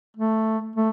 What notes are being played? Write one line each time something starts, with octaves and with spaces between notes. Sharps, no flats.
A3
A3